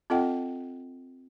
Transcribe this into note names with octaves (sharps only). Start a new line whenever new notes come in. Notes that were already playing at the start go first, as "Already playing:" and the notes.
C4 F4 A4 D#5 F#5 G5